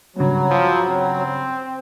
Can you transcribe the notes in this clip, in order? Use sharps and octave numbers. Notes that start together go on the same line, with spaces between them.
G2 C#3 F#3
F3
C4